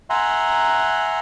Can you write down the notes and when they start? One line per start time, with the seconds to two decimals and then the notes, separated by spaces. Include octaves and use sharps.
0.10 E5 F#5 G#5 A#5 C6